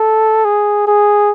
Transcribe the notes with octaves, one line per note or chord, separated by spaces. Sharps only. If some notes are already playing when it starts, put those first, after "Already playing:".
Already playing: A4
G#4
G#4